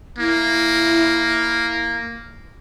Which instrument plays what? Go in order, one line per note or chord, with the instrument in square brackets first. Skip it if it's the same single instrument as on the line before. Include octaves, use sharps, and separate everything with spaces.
[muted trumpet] A#3 [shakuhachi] E4